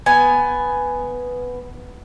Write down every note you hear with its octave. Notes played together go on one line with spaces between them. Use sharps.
B3 G#5